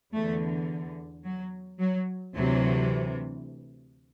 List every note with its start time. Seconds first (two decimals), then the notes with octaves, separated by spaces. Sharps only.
0.13 E2 D3 A3
1.24 F#3
1.80 F#3
2.35 D2 C3 E3 F#3